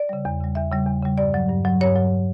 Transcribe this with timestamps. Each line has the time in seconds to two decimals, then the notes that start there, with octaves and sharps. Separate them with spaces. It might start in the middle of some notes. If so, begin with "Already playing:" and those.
Already playing: D5
0.09 C#3 G3
0.25 E2
0.41 C#3 G3
0.55 E2 E5
0.71 C#3 G3
0.86 E2
1.02 C#3 G3
1.18 G2 D5
1.34 F#3
1.50 G2
1.65 F#3
1.80 G2 C#5
1.95 F#3